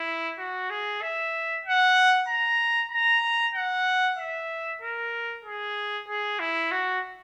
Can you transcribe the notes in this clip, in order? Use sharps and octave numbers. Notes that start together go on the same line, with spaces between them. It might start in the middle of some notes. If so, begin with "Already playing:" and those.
Already playing: E4
F#4
G#4
E5
F#5
A#5
A#5
F#5
E5
A#4
G#4
G#4
E4
F#4